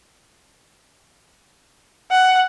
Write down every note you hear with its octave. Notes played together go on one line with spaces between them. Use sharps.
F#5